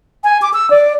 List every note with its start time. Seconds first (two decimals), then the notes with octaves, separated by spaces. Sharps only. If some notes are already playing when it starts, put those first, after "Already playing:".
0.24 G#5
0.42 D6
0.54 E6
0.70 D5